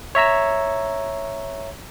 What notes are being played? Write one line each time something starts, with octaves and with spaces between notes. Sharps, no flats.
C#5 E5 A#5 E6